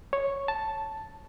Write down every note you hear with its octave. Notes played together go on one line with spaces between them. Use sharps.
C#5
A5